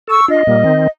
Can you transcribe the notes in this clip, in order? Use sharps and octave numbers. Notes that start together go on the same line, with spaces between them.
A4 C#6 E6
D4 F4 D#5
A#2 G3 A#3
D#3 C4